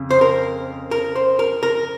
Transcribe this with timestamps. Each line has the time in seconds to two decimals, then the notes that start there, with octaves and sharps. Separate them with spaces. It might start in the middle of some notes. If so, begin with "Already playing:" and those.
Already playing: F2 C#3
0.11 C5
0.21 A#4
0.91 A#4
1.16 C5
1.39 A#4
1.63 A#4